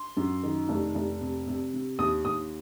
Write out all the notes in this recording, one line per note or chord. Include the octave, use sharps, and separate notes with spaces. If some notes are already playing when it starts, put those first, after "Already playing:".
Already playing: C6
F#2
D#3
F1
F1
C3
C3
C3
D#2 D#6
D#2 D#6